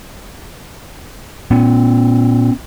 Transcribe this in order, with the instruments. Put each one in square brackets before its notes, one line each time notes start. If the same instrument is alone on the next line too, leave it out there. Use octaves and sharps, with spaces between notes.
[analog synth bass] A#2 [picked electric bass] B3 C#4